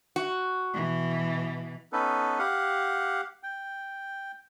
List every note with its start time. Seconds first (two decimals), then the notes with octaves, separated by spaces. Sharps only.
0.16 F#4
0.74 B2 E3
1.92 B3 C#4 D#4 A4 B4
2.39 G4 F5 F#5
3.43 G5